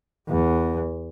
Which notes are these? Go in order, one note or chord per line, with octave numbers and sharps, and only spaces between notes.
E2